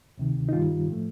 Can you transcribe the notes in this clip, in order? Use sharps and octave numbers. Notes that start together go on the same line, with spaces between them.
D2 C3 D#3
D#4
G2 D#3 G3 F4
A2 F3 A3